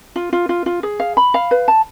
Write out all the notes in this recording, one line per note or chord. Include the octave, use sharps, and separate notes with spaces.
F4
F4
F4
F4
G#4
F5
B5
F5
B4
A5